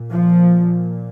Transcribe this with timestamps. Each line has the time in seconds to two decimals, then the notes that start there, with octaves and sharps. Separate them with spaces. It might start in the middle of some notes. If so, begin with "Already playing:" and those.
Already playing: A#2
0.11 F3